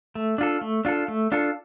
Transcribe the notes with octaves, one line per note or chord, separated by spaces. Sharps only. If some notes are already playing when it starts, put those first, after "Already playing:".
A3
D4 F4 A4
A3
D4 F4 A4
A3
D4 F4 A4